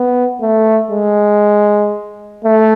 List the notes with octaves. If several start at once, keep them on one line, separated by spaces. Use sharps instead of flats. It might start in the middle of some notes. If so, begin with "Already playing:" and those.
Already playing: B3
A3
G#3
A3